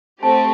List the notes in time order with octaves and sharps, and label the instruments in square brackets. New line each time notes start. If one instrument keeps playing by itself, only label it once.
[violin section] A3 C4 G4 [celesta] A5